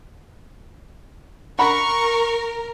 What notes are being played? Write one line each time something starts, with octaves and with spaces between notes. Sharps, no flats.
A#4 F#5 A#5 B5 C#6